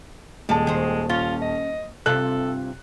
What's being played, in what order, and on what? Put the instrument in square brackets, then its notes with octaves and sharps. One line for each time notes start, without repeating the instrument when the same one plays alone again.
[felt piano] D#1 A5 [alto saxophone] G#3 [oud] D5
[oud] D#3 C5
[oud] C#4 [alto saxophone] F4
[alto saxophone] D#5
[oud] G2 C3 F4 [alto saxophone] A4 [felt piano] F#6